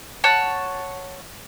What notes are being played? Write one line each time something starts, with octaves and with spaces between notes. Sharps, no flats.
C#5 F#5 A5